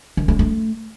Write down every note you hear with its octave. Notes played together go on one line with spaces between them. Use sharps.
D#3
A3
A3